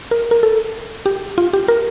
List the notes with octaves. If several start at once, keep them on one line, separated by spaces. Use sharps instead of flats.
A#4
A#4
A4
G4
F4
G4
A#4